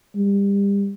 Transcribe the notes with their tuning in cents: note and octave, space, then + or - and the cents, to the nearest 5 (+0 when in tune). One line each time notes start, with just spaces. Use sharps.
G3 +30